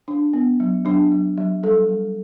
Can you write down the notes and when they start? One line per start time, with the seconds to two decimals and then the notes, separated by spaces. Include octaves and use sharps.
0.08 D4
0.33 B3
0.60 F#3
0.85 F#3 D4
1.12 F#3
1.38 F#3
1.63 G3 A4
1.89 G3